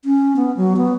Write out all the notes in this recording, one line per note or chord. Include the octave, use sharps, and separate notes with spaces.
C#4
B3
F#3
B3